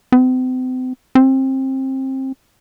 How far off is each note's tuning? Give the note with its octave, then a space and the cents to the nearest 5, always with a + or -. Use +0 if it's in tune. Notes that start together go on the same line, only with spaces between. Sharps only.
C4 -40
C4 +25